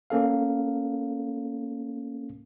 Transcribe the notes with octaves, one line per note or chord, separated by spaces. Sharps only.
A#3 C#4 A4 F5